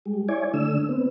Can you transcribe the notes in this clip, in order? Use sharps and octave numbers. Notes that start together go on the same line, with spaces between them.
G3 G#3
E4 C#5 D5 G#5
D3 A3 D4 E6
B3 C4